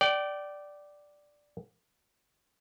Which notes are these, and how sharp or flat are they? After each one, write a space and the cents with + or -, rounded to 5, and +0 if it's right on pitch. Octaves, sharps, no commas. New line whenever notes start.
D5 +0 G5 -30